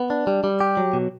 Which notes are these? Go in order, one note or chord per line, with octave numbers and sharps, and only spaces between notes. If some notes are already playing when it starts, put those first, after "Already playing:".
Already playing: B3
D4
G3
G3
G4
F#3
B2